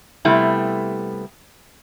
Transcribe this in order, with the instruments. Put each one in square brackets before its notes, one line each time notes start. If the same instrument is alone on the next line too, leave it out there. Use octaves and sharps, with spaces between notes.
[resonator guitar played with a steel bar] C3 G3 A3 B3 E4